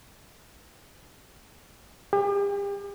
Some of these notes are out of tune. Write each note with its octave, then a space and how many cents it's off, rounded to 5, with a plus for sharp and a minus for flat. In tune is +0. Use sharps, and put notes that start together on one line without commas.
G4 +40